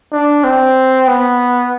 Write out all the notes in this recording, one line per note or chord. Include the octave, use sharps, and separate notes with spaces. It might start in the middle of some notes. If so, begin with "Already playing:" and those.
D4
C4
B3